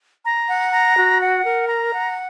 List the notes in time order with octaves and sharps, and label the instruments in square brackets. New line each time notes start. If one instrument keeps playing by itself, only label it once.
[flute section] A#5
F#5
A#5
F#4
F#5
A#4
A#5
F#5